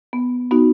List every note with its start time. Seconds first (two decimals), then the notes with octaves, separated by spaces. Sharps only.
0.13 B3
0.51 B3 D#4 F#4